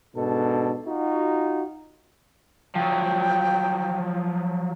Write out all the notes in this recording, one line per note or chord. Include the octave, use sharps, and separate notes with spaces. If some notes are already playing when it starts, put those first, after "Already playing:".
G#2 B2 D4 A4
D#4 F4 F#4
F3 F#3 G5